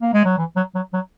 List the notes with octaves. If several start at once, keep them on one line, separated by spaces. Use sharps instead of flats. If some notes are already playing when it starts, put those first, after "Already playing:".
A#3
G#3
F#3
E3
F#3
F#3
F#3